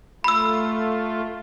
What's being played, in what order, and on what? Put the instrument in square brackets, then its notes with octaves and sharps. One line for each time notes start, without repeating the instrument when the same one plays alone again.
[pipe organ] A3 F4 [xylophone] B5 E6